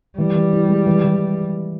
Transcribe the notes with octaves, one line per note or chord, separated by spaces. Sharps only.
E3 G3
E3
E4
G#3
E3
E3